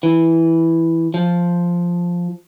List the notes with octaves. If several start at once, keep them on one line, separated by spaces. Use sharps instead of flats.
E3
F3